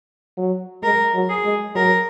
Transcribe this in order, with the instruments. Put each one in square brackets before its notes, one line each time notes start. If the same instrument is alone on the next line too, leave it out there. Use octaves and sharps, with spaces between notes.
[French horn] F#3
[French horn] G#3 [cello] A#4
[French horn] F#3
[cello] G#4
[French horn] G#3
[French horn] F#3 [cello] A#4